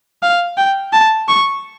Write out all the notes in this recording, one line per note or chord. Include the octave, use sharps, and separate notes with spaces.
F5
G5
A5
C#6